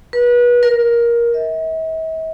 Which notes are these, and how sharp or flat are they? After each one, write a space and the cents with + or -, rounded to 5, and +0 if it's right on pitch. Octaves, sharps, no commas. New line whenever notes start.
B4 -30
A#4 +15
E5 -45